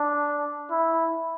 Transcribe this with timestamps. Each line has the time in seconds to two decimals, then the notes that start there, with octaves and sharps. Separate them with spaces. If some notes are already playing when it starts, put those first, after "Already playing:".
Already playing: D4
0.71 E4